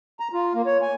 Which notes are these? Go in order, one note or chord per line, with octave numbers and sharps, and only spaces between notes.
A#5
F4
A#3
C#5
G#5